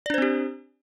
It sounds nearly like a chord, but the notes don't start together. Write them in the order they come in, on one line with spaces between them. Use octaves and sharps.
D5 D4 C5 C4 G4